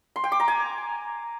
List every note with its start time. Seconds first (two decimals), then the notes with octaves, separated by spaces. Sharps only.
0.16 C6
0.24 G5
0.32 D6
0.40 A#5
0.48 G#5